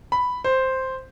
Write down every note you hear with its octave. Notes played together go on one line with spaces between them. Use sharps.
B5
C5